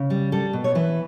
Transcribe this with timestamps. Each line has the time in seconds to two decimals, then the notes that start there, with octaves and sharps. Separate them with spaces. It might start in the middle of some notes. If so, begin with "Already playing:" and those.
Already playing: C#3
0.10 G3
0.32 G3 A4
0.53 B2
0.64 C#5
0.75 E3 B4